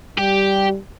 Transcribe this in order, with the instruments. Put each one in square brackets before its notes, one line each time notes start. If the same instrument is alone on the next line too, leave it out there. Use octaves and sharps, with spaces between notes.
[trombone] G3 [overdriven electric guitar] G4